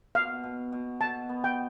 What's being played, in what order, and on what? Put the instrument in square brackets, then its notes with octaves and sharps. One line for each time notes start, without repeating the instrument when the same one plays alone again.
[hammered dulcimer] B2 [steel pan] F5
[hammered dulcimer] B2
B2
[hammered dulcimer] B2 [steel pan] A5
[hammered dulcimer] B3
[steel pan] G5